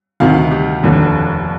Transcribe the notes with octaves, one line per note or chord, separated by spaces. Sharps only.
D2 C3 D#3 F5
G4
F1 D#2 D3